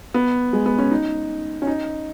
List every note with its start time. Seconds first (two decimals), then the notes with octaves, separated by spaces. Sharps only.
0.14 B3
0.53 G#3
0.66 B3
0.78 C#4
0.91 D#4
1.62 C#4
1.67 D#4